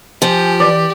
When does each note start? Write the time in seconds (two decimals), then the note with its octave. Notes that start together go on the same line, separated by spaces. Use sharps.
0.22 F3 G4 G#5
0.60 E3 D5